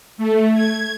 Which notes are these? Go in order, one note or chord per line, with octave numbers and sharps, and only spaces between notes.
A3
G#6